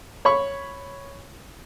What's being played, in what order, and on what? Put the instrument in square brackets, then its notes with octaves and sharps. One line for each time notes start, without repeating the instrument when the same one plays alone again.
[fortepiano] C#5 B5 C#6